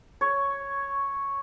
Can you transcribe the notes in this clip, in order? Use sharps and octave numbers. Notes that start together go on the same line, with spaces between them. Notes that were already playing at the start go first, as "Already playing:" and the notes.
C#5